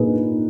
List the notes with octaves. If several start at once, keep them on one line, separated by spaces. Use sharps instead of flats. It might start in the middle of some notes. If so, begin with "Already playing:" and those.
Already playing: A#2 A#3 D#4 G#4 B4